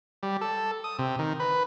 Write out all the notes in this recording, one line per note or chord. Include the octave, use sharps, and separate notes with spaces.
G3
A4
D#6
C3
D#3
B4